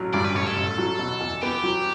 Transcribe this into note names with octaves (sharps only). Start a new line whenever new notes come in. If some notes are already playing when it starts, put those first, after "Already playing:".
Already playing: A1 F#3
G2 D5
B4
A1 C#5
A4
A1
F#3
B2
E2
B3 G4
F#3